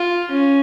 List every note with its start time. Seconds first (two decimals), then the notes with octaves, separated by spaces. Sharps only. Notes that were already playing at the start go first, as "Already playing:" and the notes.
Already playing: F4
0.31 C#4